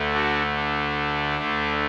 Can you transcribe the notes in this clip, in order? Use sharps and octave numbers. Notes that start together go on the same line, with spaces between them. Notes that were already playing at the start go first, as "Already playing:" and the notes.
Already playing: D2 D3 A3
D4 F#4
D4
D2 D3 A3